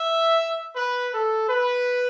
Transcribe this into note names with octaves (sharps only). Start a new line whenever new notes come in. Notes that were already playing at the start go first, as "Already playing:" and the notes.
Already playing: E5
B4
A4
B4